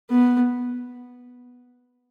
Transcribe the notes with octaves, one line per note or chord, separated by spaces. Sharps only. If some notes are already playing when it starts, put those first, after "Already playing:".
B3